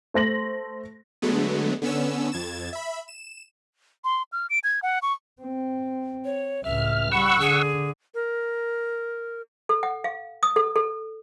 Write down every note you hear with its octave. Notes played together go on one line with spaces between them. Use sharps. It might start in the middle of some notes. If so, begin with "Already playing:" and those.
A3 C5 A#6 F#7
D3 F#3 G#3 A3 B3
D3 B3 C#4 E6
F2 G#6 A6 E7
E5 B5
E7
C6
F6
D7
G#6
F#5
C#6
C4
C#5
C#2 A2 E5 F6
G3 F#5 B5 C#6 E6
D3 G#4
A#4
A4
F#5
F5
D#6
A4
A4